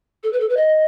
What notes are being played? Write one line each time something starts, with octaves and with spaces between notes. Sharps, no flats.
A4
B4
A4
B4
D#5